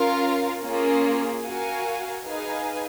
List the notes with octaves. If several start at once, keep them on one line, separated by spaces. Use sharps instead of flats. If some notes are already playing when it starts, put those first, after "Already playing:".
Already playing: C#4 F4 A#4 F5
A#3 C#4 F4 G#4
F#4 A#4 F5 G#5
D#4 G#4 B4 F5 G#5